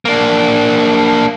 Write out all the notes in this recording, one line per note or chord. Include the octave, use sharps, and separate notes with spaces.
A#3 D4